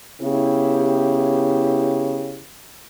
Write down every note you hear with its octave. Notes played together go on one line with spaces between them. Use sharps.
C#3 B3 E4 G4